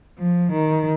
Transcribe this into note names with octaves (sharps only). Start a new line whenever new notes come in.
F3
D#3